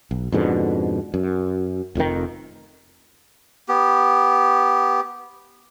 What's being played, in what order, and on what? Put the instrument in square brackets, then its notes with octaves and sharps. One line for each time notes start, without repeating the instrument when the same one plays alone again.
[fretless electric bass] B1
F2 G#2 B2 D3
F#2
F1 F2 A2 D#3
[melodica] B3 G4